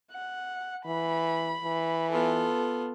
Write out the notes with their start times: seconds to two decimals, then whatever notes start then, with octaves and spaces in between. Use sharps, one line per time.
0.12 F#5
0.86 E3 B5
1.63 E3
2.12 B3 F4 A4